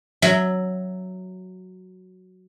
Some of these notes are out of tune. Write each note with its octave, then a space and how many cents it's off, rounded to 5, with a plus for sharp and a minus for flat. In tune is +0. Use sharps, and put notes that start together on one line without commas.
F#3 +0 E5 +0